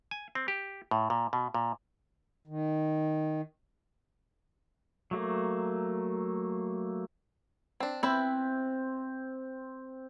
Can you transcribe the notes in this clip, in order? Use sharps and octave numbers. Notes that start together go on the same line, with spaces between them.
G#5
C4
G4
A2
A#2
B2
A#2
D#3
F#3 A3 A#3
C4 D4
C4 E4 B4 E5